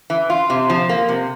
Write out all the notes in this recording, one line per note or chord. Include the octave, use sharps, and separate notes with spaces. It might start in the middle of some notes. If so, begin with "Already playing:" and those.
E3
F4
C3
F3
A#3
C3